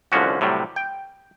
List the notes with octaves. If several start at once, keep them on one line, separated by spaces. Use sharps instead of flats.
C2 D3 F3 C#4 F#4
A2 C3 F#3 G3
G5